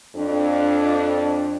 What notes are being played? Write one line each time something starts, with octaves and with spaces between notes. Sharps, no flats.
F2 D4